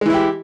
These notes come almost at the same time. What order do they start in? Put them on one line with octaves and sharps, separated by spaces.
G#3 E3 E4 G4